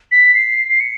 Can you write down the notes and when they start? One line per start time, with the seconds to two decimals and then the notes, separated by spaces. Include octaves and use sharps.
0.12 B6
0.34 C7
0.69 C7
0.80 C#7